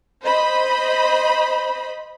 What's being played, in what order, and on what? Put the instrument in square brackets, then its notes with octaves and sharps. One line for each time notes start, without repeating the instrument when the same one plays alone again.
[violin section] C5 D#5 B5